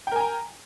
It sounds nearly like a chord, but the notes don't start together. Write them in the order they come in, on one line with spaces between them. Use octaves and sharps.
G5 A#4 G#5 A#5